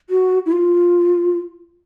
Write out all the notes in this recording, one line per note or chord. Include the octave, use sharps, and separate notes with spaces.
F#4
E4
F4